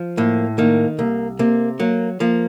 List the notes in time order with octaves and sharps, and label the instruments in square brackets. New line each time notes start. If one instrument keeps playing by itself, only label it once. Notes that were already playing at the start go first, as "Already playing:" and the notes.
Already playing: [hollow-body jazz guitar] F3
[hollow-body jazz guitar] A2 [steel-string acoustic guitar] A#3
[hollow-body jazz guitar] D#3 [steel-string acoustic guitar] A#3
[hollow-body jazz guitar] C2 [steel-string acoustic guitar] A#3
[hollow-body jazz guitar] C3 [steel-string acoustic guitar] A#3
[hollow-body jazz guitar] F#3 [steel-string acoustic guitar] A#3
[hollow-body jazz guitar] F3 [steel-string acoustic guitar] A#3